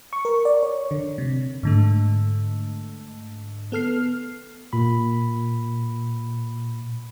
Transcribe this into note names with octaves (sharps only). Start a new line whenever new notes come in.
C#6
A#4
D5
C#5
D3
C3
G#2 D3 A3
B3 A4 F6 C7
A#2 B5